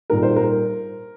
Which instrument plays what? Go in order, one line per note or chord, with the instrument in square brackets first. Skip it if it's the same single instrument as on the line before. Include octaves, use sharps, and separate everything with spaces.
[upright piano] A#2 G3 D#4 A#4
C5
A#4